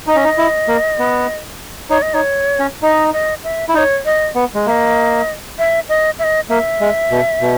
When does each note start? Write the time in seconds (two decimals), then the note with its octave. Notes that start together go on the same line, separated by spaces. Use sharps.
0.07 D#4 D#5
0.16 C#4
0.25 D#4
0.38 E4
0.68 A#3
0.99 B3
1.90 D#4 C#5
2.02 D#5
2.14 D#4 C#5
2.60 C#4
2.83 D#4 D#5
3.13 D#5
3.44 E5
3.69 E4
3.74 D#4 C#5 D#5
4.05 D#5
4.35 B3
4.55 G#3
4.66 A#3 E5
4.71 D#5
5.59 E5
5.89 D#5
6.19 E5
6.24 D#5
6.49 A#3 E5
6.81 G#3
7.11 B2
7.41 B2